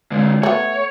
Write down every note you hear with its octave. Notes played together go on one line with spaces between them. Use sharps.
D3 G#3
A3 B3 C#5